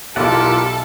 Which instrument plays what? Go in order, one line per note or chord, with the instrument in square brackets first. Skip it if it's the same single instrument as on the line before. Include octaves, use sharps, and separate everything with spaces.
[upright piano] B1 [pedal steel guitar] E4 D5 F#5 [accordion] F4 G4 A#4 [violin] A4